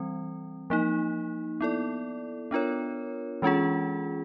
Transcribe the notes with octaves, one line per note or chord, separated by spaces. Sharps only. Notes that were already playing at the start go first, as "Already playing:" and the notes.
Already playing: E3 G3 C4
F3 A#3 D#4
B3 E4 A4 D5
B3 D4 F4 A#4 C#5
E3 G#3 C#4 F4 G#4